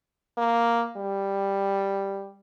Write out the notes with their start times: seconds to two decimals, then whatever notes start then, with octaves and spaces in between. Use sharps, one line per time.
0.37 A#3
0.97 G3